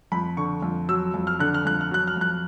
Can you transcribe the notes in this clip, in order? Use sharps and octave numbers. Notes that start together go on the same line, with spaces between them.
F2 B5
D3 C#6
F2
F#3 E6
F2
F6
D3 F#6
F6
F2 F#6
F6
F#3 F#6
F6
F2 F#6